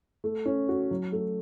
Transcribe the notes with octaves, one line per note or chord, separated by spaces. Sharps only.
A3
C#4
F#4
F#3
A3